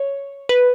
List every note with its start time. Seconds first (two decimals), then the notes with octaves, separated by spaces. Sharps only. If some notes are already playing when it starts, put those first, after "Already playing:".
Already playing: C#5
0.49 B4